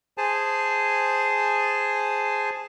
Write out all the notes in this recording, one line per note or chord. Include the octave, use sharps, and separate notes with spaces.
G#4 C5 G#5 A5